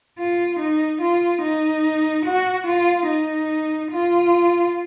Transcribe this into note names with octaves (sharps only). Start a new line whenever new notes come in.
F4
D#4
F4
D#4
F#4
F4
D#4
F4